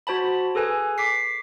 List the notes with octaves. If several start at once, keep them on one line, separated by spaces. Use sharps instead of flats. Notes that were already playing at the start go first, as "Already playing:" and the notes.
F#4 C5 A5 B5
G#4 A4 B4 G#5
D6 B6 C7